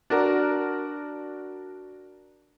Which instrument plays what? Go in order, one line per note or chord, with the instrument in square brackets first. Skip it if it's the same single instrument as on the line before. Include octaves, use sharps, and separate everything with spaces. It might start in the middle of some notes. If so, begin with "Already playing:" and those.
[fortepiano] D4 F#4 A#4